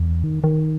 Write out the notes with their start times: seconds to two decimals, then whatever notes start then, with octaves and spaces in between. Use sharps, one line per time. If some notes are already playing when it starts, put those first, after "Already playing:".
Already playing: E2
0.24 D#3
0.44 D#3